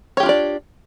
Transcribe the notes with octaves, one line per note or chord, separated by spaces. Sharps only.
D4 F4 G4 C#5 D5